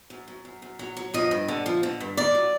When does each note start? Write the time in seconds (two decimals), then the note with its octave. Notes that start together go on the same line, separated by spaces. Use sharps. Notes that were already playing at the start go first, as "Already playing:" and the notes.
0.10 F#2
0.28 F#2
0.45 F#2
0.62 F#2
0.79 F#3
0.97 F#3
1.14 F3 D#5
1.31 G2
1.48 D3
1.66 F3
1.83 D3
2.00 G2
2.17 D#3 D5
2.35 F#3